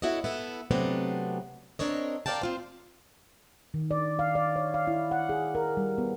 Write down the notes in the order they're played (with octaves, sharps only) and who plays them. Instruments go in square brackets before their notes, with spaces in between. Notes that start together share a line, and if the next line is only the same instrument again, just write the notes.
[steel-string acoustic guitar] E4 F#4 A4 C#5 D#5
B3 E4 A4
C3 F#3 A3 B3 C4 D4
C4 D4 A#4 C#5 D#5
A#4 B4 D5 F5 G5 A5
C4 F4 C5
[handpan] D#3
D5
F5
D5
C#5
F5
E4
F#5
G#4
A#4
G3
B3